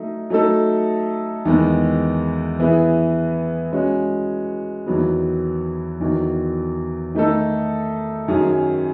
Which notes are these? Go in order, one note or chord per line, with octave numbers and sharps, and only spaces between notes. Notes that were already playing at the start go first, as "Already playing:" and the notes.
Already playing: F#3 A3 D#4
F#3 A3 D#4 A4
E2 D#3 G#3 B3
E3 B3 E4 G#4 B4
G#3 C#4 F#4 C#5
E2 D#3 F#3 B3
E2 D#3 F#3
D#3 A3 D#4 A4
F#2 D#3 F#3 C#4 G#4